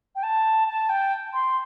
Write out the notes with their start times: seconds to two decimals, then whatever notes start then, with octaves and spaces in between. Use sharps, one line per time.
0.16 G5
0.23 A5
0.68 A5
0.89 G5
1.33 C6